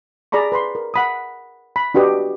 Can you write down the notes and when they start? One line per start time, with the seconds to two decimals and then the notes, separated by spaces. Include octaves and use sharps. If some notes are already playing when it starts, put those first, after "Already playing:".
0.32 G#4 D5 A#5 B5 C#6
0.52 B4 B5 C6
0.75 A#4
0.94 F#5 B5 D#6
1.76 B5
1.94 D4 F#4 G4 B4 D#5